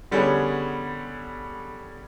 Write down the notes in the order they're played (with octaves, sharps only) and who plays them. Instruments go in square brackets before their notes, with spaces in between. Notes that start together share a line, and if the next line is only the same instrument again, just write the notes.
[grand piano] D3 G3 B3 C#4 G#4 C#5